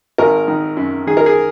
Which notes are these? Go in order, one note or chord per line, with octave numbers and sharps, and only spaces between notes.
G#1 A#4
D#3
F#2
D#3 G#4
A#4
G#4